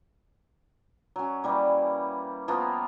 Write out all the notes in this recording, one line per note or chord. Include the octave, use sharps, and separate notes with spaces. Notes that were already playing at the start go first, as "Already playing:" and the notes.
F#3 C#4
E3 G3 A#3
F3 A#3 B3 F4